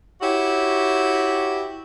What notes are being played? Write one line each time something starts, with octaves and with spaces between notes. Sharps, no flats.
E4 F#4 G4 C#5